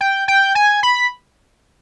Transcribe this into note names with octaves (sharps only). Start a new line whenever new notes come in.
G5
G5
G#5
B5